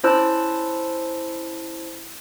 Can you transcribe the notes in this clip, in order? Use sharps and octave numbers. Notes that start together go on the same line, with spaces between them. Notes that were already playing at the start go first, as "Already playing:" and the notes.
C#4 E4 C5 A5 E6 F#6